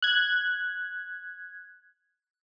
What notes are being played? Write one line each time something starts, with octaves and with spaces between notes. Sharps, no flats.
F#6 G#6